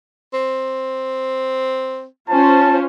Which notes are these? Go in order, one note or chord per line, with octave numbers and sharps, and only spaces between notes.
C4
C#4 F4 C5 A5